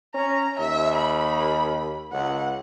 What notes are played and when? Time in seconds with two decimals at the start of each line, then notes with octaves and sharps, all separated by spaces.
0.15 C#4 A#5
0.59 D#2 E5
0.95 B5
2.12 C#2 F#5